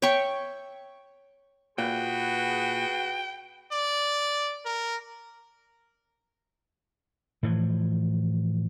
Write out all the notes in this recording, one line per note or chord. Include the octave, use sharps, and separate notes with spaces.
C#5 E5 G5 C#6
A#2 F#4 G#4 B4 G5
D5
A#4
A2 E3 F3